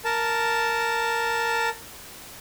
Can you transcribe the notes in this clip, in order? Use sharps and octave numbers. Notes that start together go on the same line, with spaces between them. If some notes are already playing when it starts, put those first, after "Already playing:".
A#4 A5